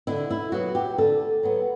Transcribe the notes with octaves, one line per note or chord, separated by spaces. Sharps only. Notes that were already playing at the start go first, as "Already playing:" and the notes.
D3 E4
E4
F#3 B3 F#4
G4
D3 A4
F#3 B3